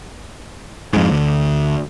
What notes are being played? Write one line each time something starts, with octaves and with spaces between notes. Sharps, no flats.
F2 G#2
D2